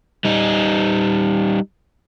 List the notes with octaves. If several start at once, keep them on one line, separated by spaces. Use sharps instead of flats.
G3 D#4